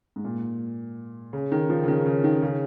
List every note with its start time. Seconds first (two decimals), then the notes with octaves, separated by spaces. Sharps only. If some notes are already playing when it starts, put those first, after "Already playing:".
0.16 G#2
0.24 A#2
1.33 C#3
1.52 D#3
1.69 F3
1.83 C#3
1.88 D#3
2.06 C#3
2.24 D#3
2.43 C#3